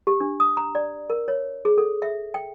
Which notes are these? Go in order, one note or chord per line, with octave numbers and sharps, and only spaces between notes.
G4
D4
D#6
A#5
D5
A#4
C#5
G#4
A4
E5
G5